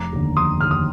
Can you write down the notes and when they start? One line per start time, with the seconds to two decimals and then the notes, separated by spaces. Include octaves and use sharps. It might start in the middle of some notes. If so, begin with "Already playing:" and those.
Already playing: F1 A#5 D6
0.13 D#2 D3
0.37 F1 C6 D#6
0.61 D#2 D3 F6
0.71 D#6